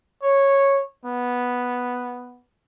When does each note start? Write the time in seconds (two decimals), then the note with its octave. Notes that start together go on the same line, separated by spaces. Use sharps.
0.22 C#5
1.05 B3